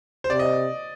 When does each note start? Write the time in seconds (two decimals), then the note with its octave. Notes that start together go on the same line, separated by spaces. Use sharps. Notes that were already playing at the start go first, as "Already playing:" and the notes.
0.24 C5
0.30 C3 D5
0.39 D#5